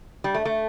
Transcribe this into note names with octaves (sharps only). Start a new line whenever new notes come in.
G3
A3
A3